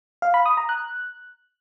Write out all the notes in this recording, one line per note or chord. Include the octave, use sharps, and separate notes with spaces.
F5
B5
D#6
A#5
F#6